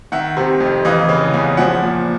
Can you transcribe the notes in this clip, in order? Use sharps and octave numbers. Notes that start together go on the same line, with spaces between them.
D#3 E5 F#5
C3
F2
E3 D#5 F5
C#3
E2
F3 E5 F#5
A#2